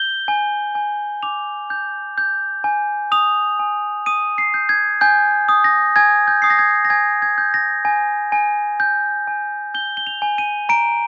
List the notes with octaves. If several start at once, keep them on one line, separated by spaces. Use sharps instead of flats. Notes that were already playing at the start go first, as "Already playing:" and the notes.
Already playing: G6 G7
G#5
G#5
D6 F7
G6
G6
G#5
D#6 F7
G#5
D#6 D#7
C7
G6
G#6
G#5 G6
D#6
A#6
G#5 G#6
G6
D#6 C7
A#6
G#6
A#6
G#5 G#6
G#6
G6
A#6
G#5
G#5
G6
G#5
G6 G7
G7
F7
G#5
D#7
A#5 D7